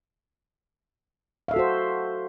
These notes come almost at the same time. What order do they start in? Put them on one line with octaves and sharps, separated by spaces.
F5 E5 A4 F#4 C5